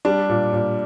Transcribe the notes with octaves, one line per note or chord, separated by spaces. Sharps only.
G3 D4
A#2
A#2